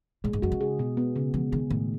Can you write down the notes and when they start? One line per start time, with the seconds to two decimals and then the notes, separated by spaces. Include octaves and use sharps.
0.24 A2 G#3
0.33 G#2
0.42 F#2 F#4
0.52 C#3
0.61 G#4
0.79 B2
0.97 B3
1.16 C#3
1.34 E3 G#3
1.52 D#3 G#4
1.70 A2 D#3